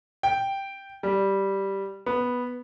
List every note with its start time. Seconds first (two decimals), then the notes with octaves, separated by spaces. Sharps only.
0.23 G5
1.03 G3
2.06 B3